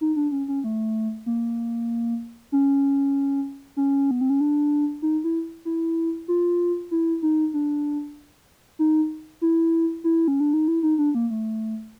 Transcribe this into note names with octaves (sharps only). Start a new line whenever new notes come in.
D#4
D4
C#4
C#4
A3
A#3
C#4
C#4
B3
C4
C#4
D4
D#4
E4
E4
F4
E4
D#4
D4
D#4
E4
E4
C#4
D4
D#4
E4
D#4
D4
A#3
A3